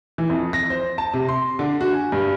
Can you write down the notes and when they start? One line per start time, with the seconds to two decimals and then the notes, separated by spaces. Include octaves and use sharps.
0.18 E3
0.30 F2
0.53 A#6
0.70 C5
0.98 A5
1.14 C3
1.29 C6
1.59 D3
1.81 F#4
1.93 G#5
2.12 G2